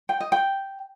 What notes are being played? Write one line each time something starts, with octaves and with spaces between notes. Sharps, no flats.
G5
D#5
G5